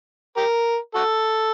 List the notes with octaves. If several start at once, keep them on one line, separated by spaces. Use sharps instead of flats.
G4 A#4
F#4 A4